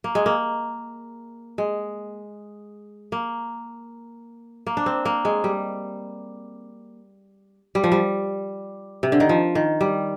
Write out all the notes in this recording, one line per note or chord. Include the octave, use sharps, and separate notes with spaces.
A#3
G#3
A#3
G#3
A#3
A#3
D4
C4
A#3
G#3
G3
G3
F3
G3
C3
D3
D#3
F3
D#3
G3